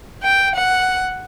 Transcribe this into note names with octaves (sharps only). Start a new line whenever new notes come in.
G5
F#5